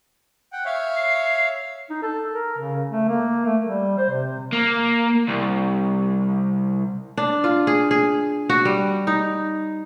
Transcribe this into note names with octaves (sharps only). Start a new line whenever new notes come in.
F#5 G5
C#5 E5 F5
C7
D#4
A4
A#4
C#3
A3
A#3
A3
G3
C5
C3
A#3
C2
D4
F4
G#4
G#4
F#4
G3
D#4